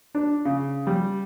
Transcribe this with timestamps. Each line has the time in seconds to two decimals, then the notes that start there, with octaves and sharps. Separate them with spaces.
0.15 D4
0.45 C#3
0.87 G3